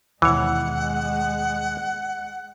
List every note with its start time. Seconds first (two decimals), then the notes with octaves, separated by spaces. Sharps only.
0.22 D#2 B2 E3 G#3 C#5 F#5